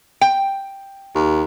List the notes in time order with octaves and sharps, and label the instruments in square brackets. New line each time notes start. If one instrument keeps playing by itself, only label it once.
[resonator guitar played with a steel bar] G5
[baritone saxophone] D#2